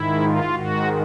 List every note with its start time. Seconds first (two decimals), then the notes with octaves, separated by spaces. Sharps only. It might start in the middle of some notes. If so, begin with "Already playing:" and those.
Already playing: G#2 D#3 E4
0.20 F4
0.53 G#2 D#3 F#4